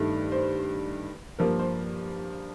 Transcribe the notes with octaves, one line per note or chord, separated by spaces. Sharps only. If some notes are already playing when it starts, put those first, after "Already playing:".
Already playing: G2 D#3 A3
C5
G2 F3 A#3 A#4
C5